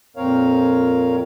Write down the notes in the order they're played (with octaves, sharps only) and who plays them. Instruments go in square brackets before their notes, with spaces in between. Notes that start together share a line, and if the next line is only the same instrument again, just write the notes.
[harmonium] F2 A#2 C4 A#4 C#5 F5